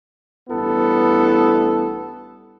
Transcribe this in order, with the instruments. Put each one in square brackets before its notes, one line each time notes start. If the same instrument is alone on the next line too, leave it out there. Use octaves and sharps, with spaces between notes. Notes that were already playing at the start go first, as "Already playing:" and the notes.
[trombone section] A1 G2 B3 E4 A4